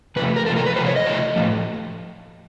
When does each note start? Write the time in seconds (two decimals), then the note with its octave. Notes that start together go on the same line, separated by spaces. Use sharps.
0.16 C3 F3 A3 B4
0.36 A#4
0.46 C3 F3 A3 A4
0.56 A#4
0.66 B4
0.76 C3 F3 A3 C5
0.86 C#5
0.96 D#5
1.06 C3 F3 A3
1.36 A2 F3 A3